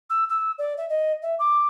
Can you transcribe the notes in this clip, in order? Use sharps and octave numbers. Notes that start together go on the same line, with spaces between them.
E6
E6
D5
E5
D#5
E5
D6